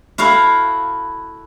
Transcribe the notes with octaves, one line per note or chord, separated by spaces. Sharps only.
E4 F#4 A4 F5